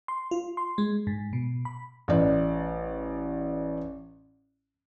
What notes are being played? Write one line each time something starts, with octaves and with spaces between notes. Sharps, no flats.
C6
F4
C6
G#3
G#2
B2
B5
A1 D5